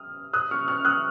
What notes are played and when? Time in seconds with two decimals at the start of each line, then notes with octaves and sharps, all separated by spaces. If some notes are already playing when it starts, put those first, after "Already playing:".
Already playing: D#6 F6
0.33 D#6 F#6
0.51 C#6 F6
0.68 C#6 F6
0.85 D#6 F#6